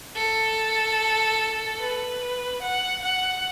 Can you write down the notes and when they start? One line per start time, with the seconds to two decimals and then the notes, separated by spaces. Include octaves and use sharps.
0.16 A4
1.80 B4
2.62 F#5
3.02 F#5